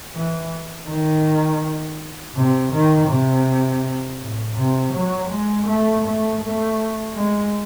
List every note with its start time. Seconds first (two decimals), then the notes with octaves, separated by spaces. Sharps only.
0.16 E3
0.88 D#3
2.35 C3
2.72 D#3
3.09 C3
4.20 A2
4.57 C3
4.94 F#3
5.30 G#3
5.67 A3
6.04 A3
6.41 A3
7.15 G#3